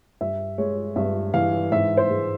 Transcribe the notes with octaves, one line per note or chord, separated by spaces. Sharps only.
G2 E5
G#3 C#5
G2 E5
E3 F5
G#2 E5
C5
G#3